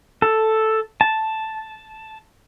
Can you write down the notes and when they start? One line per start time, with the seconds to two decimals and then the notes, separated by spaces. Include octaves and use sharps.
0.22 A4
1.01 A5